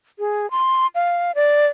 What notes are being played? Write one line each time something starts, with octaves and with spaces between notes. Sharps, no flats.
G#4
C6
F5
D5